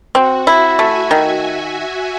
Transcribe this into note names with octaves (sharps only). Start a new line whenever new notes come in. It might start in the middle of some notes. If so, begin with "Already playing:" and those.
C4 F#4
E4 E5
A3 G#5
D#3